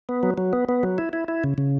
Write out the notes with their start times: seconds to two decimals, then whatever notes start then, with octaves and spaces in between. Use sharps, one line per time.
0.09 B3
0.23 F#3
0.38 F#3
0.53 B3
0.69 B3
0.83 F#3
0.98 E4
1.13 E4
1.28 E4
1.44 C#3
1.58 C#3